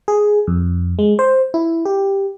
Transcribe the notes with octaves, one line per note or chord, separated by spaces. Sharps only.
G#4
F2
G#3
C5
E4
G4